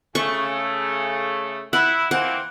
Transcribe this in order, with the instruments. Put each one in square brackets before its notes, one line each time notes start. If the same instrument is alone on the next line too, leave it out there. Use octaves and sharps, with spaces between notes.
[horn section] C#3 A3 [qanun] C#6
[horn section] E4 [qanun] F#5
[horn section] E3 A#3 C4 [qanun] F#5